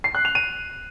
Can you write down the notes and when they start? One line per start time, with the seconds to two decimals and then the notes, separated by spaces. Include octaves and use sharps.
0.04 C7
0.15 F#6
0.25 F7
0.35 D#7